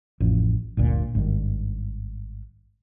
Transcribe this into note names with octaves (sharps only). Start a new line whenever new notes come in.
A1 F2
G1 D2 A#2
G#1 G2 D#3